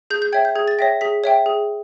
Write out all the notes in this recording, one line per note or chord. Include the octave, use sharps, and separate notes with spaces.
G#4 G6
G6
C#5 E5 G5 G#6
G6
G#4 G#6
A6
C#5 E5 G5 A#6
G#4 B6
C#5 E5 G5
G#4